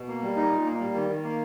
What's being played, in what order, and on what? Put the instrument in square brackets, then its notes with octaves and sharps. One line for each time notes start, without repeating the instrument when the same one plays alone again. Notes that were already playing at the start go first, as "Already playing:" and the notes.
Already playing: [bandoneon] B2
A#3
G3
D#4
A#2
A#3
G3
D#3
D#3
A#3